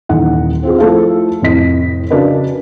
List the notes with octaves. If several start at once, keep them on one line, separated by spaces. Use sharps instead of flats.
D#1 E3 D#4 F#5
C4 F4 G#4
F3 A3 E4 A4 C5 F5
F1 A2 D#5 B6
C#3 D4 F#4 A#4 B4 D#5